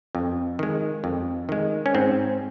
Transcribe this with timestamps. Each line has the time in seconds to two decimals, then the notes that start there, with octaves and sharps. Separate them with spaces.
0.15 F2
0.59 D#3 G#3
1.04 F2
1.49 D#3 G#3
1.86 C#4
1.94 G#2 C4